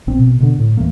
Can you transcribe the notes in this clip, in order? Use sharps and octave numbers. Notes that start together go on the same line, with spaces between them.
A#1 C4
B2
B2 D3
A2
D#2 E3 A3 A#3